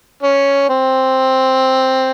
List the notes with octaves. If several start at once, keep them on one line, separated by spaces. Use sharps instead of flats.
C#4
C4